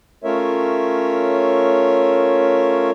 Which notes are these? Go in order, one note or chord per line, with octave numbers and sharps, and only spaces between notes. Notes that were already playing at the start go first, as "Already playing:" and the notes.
A3 C#4 F4 A#4 C#5 E5